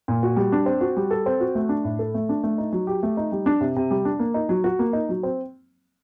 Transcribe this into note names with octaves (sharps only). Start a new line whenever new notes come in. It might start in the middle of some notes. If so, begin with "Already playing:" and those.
A#2
F#4
G3
D4
C4
F#4
G3
A4
C4
F#4
A3
D4
A2
A4
A3
D4
A3
D#4
F#3
G4
A3
D#4
G3
D4
C3
C3
G3
D4
A#3
D#4
F#3
F#4
A#3
D#4
F#3
C4